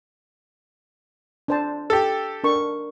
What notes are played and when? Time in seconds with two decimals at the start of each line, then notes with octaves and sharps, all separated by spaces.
1.48 D4 C5 A5
1.90 G4 A4
2.44 D4 A#4 C#6